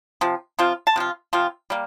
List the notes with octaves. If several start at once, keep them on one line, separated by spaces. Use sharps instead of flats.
C3 F3
C3 F3 C4 F4
A5
C3 F3 F4
C3 F3 C4 F4
G3 A#3